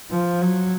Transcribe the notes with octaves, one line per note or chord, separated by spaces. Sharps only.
F3
F#3